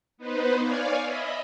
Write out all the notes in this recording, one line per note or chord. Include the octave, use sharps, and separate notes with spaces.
B3 D#4 B4 C5
C#5 D5 F5 G#5
D#5 E5 B5